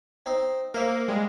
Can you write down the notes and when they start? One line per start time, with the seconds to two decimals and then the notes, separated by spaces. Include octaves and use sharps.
0.26 C4 D#4 C5
0.74 A#3 C5 E5 F5
1.08 G3 G#3